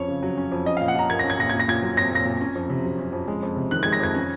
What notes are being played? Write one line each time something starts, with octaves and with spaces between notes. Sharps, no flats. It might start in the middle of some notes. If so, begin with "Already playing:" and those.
Already playing: F2 C#4 C#5
C#3
F#3
C#4
F2
C#4 D#5
F5
A#2
F#5
F3 A#5
A#3 G#6
C#4 A#6
G#6
A#2 A#6
A#2 G#6
A#6
A#2 G#6
F#3
C4 A#6
A#2 A#6
A#2
C#4
F2
C3
F#3
C#4
F2
G#3
F2
C3
D#3 F#6
G#6
G#3
A#6
F2 G#6
C#4